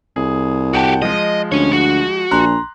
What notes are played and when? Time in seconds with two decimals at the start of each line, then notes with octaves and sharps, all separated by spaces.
0.16 C2 G#4
0.73 F#4 G4 F#5 G5 A5
1.02 F3 G#3 D#5
1.52 D2 C#4 C#5
1.72 F#4
2.31 A#1 A#5 C6 F#6